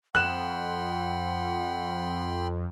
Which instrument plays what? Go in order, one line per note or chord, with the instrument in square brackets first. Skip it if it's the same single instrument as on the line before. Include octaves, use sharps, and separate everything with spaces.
[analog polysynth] F2 [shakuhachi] F#5 [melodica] G5 B5 C6 [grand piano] F#6 E7